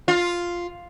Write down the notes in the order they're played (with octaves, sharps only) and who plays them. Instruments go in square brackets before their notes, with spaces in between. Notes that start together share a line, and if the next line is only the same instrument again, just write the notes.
[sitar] F4